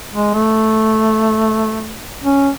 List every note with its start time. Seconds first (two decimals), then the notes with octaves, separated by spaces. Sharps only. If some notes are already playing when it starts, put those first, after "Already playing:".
0.14 G#3
0.34 A3
2.24 C#4